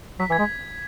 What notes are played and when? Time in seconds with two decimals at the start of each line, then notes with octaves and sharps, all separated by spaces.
0.19 F#3 B6
0.30 E3
0.32 G#6
0.39 G#3